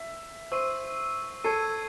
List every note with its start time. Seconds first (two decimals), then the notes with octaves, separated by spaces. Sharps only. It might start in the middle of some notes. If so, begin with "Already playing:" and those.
Already playing: E5
0.52 C5 C#6 E6 C7 D#7
1.44 A4 C#6 G#6 C7 D#7